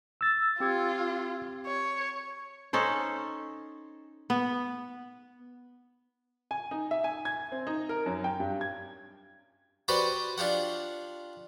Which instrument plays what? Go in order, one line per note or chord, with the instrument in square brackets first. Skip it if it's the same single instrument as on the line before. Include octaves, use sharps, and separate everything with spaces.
[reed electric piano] E6 A6
[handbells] C4 G4 G#6 [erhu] F4
[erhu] C#5
[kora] C#4 D#4 A4 C5
B3
[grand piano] G#5
D#4
E5
G#5
G#6
C4
D#4
A#4
F#2
G5
G2
G#6
[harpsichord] F#4 G4 B4 C5 D5 G5
D4 F4 G4 F#5